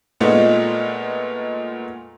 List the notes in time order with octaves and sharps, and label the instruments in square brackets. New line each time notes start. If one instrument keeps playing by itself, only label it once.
[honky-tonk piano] A#2 G#3 A3 B3 D#4 F4